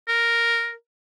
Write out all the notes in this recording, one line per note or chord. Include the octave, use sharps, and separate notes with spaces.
A#4